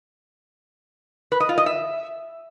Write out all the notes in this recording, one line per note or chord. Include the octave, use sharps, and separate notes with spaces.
B4
D#5
F4
D#5
E5